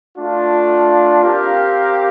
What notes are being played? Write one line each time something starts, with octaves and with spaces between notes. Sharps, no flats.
A3 D4 F4
C4 G4 A#4 F5